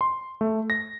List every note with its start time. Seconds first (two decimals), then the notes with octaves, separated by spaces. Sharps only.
0.01 C6
0.41 A3
0.70 A#6